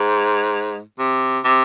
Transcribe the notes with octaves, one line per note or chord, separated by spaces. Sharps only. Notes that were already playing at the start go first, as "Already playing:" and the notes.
Already playing: G#2
C3
C3